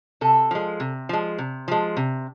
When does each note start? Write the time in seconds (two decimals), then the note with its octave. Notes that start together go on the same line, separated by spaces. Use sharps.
0.21 C3 A4
0.51 F3 G#3
0.80 C3
1.09 F3 G#3
1.38 C3
1.68 F3 G#3
1.97 C3